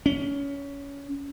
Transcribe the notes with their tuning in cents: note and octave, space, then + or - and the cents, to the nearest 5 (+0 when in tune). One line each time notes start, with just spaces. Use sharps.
C#4 +20